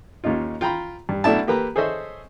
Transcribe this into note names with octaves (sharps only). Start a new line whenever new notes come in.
D#2 C#4 D#4 F4
F4 G5 A#5 B5
G2
B1 A3 D4 E4 A5
A#3 G4 A4 B4 A#5
G#4 A4 C5 C#5 D#5 E5